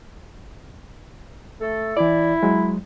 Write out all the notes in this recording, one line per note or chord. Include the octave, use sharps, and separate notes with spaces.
A3 A4
E3 E4 D5
F#3 G#3